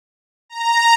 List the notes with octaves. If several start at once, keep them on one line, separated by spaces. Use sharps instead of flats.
A#5